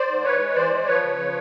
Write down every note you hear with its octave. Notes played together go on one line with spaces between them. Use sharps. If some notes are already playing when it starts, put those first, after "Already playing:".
Already playing: C5 D5
G#2
E3 B4 C#5
G#3
E3 C5 D5
G#3
F3 B4 C#5
C#3
F3